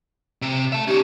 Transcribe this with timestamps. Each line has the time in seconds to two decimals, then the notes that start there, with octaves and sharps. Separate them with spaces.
0.42 C3
0.72 E5 A5
0.88 C#4 D#4 G4